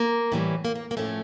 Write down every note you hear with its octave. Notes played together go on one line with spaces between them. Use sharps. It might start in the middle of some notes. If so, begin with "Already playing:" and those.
Already playing: A#3
A2 E3 G3
A#3
A#3
A#3
A2 F3 A3 C#4